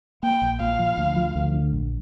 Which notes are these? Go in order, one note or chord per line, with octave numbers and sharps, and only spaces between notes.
A#3 G5
A#1
A#2 F5
F3
D2
F3
D2
D3
A#1